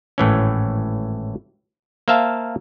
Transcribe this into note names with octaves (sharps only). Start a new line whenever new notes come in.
G#1 A2 E3 C#4
A#3 C5 E5 F5 A5